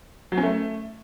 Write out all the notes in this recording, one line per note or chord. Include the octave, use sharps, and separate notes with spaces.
F#3
C#4
A3